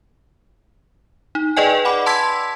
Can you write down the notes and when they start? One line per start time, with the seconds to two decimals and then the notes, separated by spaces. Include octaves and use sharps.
1.35 D#4
1.57 G#4 B4 D5 D#5 G5 G#5
1.85 F#5 B5 D6
2.06 A5 C6 E6 G#6 B6